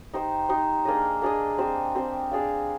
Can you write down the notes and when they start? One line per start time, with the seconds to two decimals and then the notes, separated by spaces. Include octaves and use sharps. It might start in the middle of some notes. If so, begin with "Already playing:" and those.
0.14 D#4 G4 C5
0.49 D#4 G4 C5
0.85 A#3 D4 G#4 D#5
1.22 A#3 D4 G#4 D#5
1.58 C4 G4 C5
1.95 C4 G4 C5
2.31 D4 G#4 D5 F5